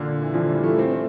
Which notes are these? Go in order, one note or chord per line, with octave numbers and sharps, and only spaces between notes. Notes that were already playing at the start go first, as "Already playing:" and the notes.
Already playing: A#2 D3
E3
D3 F3
E3 G3
F3 A3
A3 C4
A3 C4